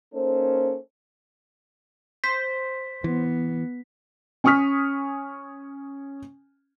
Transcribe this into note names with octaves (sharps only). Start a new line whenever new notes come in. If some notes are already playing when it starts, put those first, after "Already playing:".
A#3 C#4 D#4 A4 C5
C5 B6
E3 B3
C#4 G#5 C#6 D#6 F6 B6